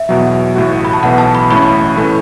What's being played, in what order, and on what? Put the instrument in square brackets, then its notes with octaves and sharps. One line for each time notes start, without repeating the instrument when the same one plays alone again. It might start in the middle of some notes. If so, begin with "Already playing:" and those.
Already playing: [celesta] E5
[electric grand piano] E2 B2 F#3
A1 A2 A3 F#4
[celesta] B5
A5
[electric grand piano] B1 A2 E3 B3 [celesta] F#5
[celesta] A5
B5
[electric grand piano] A1 A2 A3 C#4 [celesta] B5
[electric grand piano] A2 E3 A3 C#4